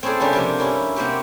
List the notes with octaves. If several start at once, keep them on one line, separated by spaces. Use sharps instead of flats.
C4 C#4 E4 G#4 A4 D5
C#3 G3 A#3 C#4 D4 G4
C3 F3 A#3 F4
G2 C#4 E4 A#4
C3 A#3 C4 F#4 G4